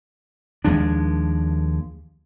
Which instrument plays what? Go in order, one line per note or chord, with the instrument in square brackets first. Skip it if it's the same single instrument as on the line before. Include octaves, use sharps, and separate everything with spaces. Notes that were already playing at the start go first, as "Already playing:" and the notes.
[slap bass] D#2 F3 G#3 D4